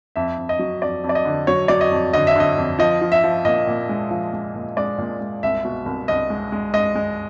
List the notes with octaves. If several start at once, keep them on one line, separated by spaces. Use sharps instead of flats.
F2 E5
F2
D#5
F#3
F2 D5
F2
D5
D#5
D3
F#3 C#5
F#3 D5
D#5
F2
D3 D#5
E5
D3 D#5
F2
F3 D#5
F3
E5
F3
A#2 D#5
A#2
G#3
F3
G#3
A#2
G#3 D5
A#2
G#3
C2 E5
B2
C2
C2 D#5
G#3
G#3
G#3 D#5
G#3